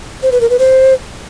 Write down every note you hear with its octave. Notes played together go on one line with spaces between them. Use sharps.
C5
B4
A#4
B4
C5